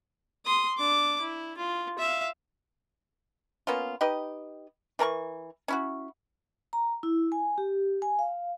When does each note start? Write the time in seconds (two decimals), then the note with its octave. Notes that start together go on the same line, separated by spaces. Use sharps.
0.45 C6 D#6
0.78 D4 D6
1.21 E4
1.57 F4
1.99 E5 F5
3.67 A#3 B3 C#4 F4
4.01 D#4 G4 B4 D#5
4.99 E3 A#4 A5 C#6
5.68 C#4 E4 F#4
6.73 A#5
7.03 E4
7.32 G#5
7.58 G4
8.02 G#5
8.19 F5